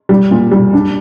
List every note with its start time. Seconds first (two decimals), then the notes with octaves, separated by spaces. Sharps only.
0.09 G3
0.31 A#2
0.51 G3
0.73 D4